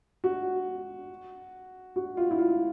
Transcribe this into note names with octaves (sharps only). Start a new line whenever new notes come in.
F#4
F#4
F4
E4
F4